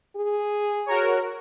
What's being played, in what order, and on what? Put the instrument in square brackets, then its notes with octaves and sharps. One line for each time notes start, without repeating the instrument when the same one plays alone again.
[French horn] G#4
[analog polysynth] F#4 A#4 C#5